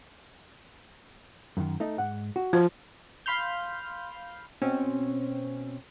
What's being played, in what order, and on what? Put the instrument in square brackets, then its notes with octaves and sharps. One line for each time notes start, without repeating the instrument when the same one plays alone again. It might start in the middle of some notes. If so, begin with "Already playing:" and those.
[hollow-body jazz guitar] F#2 D#3
A3 D#4 D#5
G#2 F#5
F#4
[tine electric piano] F3 [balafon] C5
[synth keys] F5 B5 C6 F6 G6
B2 C4 C#4